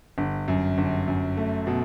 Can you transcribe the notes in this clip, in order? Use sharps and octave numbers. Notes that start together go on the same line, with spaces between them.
G1
F#2
G1
F#2
A3
B2